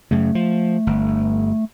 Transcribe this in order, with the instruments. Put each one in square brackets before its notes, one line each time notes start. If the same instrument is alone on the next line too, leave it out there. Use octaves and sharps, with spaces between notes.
[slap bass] F#2 C#3 [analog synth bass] A3
[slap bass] F3
G1